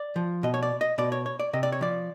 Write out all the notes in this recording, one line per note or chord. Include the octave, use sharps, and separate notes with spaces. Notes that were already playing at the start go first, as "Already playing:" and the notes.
Already playing: D5
F3
B2 D#5
C#5
D5
D#5
B2 D5
C#5
C#5
D5
C3 D#5
D5
C#5
F3 D5